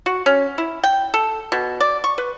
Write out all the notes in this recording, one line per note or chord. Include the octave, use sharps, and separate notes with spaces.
F#4
C#4
E4
G5
A4
B2
D5
C#6
B4